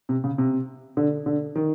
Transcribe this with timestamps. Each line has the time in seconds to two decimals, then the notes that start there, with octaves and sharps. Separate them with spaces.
0.09 C3
0.24 C#3
0.38 C3
0.97 D3
1.26 D3
1.56 D#3